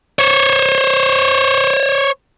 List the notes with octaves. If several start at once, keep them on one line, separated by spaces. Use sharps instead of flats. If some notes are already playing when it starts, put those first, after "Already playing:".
C5 C#5